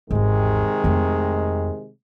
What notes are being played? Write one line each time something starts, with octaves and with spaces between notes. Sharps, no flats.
G#1 E2 C3 D#3 G#3
F2 A3